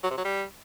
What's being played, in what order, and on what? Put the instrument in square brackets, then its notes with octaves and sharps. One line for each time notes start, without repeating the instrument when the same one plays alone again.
[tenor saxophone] F#3
C3
F#3
G3